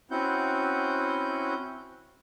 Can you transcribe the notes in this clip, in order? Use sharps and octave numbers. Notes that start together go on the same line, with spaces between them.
C4 C#4 E4 F#4 F#5 G6